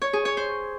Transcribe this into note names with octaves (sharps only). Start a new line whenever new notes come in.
C#5
G#4
C#5
C5